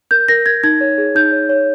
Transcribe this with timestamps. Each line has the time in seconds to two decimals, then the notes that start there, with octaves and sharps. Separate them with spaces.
0.11 A#4 G6
0.28 A#4 A#6
0.46 A#4 G#6
0.64 D#4 G#6
0.81 C#5
0.98 G#4
1.15 D#4 G6
1.32 C#5
1.49 C#5